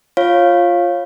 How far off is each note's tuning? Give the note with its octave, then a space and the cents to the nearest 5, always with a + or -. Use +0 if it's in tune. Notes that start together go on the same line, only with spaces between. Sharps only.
F4 +0 C#5 -25 F5 +0